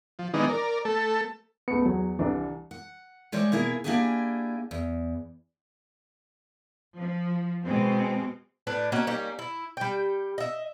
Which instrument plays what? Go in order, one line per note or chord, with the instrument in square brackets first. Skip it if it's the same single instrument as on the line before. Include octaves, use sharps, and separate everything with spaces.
[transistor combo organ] F3
D#3 E3 G#3 B3 D4 D#4
A#4 D5
A3 A4
[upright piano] C#2 A3 C#7 [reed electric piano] B3
[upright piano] E2 [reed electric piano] F#3
[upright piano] C2 D4 [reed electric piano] E3
[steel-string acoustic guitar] F#5
E3 G3 G#3 C5 C#5
B2 A#3 E4 G#4
A#3 D4 E4 G4 G#4 G#5
E2
[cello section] F3
B2 G#3 C4
[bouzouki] A2 D4 B4
A#3 C#4 F#4 D#5
G3 A#3 C#4 D#4
E4
G3 G5
D#5 E5